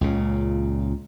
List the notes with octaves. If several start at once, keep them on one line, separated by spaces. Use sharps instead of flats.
C#2 A#2 C#3